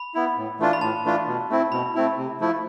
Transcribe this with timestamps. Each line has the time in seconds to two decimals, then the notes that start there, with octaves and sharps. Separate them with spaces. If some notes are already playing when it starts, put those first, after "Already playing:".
Already playing: B5
0.15 B3 E4
0.37 A2
0.60 E3 A3 D4 F4
0.73 B5
0.81 A2 A5
1.05 E3 A3 D4 F4
1.27 B2
1.49 A3 C4 E4
1.72 B2 B5
1.95 A3 C4 E4
2.17 C3
2.40 F3 A3 E4